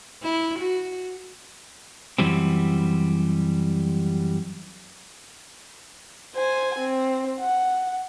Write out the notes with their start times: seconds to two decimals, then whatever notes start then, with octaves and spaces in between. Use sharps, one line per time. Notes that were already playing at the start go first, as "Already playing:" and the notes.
0.22 E4
0.59 F#4
2.18 F#2 E3 G3 C4
6.35 C5 G#5
6.79 C4
7.39 F#5